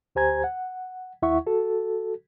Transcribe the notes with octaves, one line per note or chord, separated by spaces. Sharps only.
D2 G4 C5 G#5 A#5 G#6
F#5
D#2 E4 E5 F#5 C#6
F#4 A4